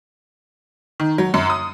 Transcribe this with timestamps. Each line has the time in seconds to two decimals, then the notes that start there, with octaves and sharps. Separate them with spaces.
1.00 D#3
1.18 F#3
1.34 F#2
1.50 D#6